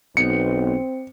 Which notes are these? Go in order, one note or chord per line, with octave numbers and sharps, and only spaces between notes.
B1 B3 C4 D#4 C#7